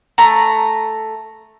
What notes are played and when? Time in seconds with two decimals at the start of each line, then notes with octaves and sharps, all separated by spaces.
0.18 A3 A#5